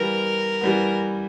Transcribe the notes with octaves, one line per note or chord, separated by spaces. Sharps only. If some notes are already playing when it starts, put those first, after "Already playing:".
Already playing: E3 G3 B3 A#4
E3 G3 B3